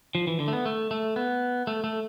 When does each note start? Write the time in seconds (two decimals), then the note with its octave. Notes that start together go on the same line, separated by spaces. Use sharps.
0.15 F3
0.27 E3
0.40 D3
0.48 A3
0.53 B3
0.66 A3
0.91 A3
1.16 B3
1.67 A3
1.84 A3